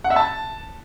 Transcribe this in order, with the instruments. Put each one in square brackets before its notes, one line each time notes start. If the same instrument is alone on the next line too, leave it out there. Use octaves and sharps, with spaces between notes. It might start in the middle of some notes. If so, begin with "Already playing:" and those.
[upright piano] F#5
E5
A5